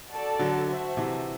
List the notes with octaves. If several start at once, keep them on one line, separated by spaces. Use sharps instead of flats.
F#4 A4 D5 A5
D3 F#3
F#4 C5 E5 A5
C3 E3